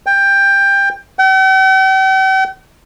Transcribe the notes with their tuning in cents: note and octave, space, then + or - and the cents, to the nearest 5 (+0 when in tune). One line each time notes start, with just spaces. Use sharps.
G5 +15
G5 -45